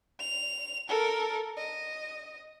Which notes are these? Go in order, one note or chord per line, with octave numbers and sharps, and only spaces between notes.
F7
A4 A#4
D#5